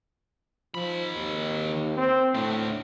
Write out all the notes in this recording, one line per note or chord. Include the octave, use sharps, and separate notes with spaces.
D#3 F3 B5
D#2
C4
A2 A3 D4